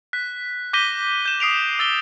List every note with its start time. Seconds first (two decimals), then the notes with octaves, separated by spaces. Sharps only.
0.13 F#6 B6
0.73 D6 G6 A#6 B6 D#7 G7
1.26 G6 E7
1.40 D#6 C7 D7 F7
1.79 E6 A6 C7 G7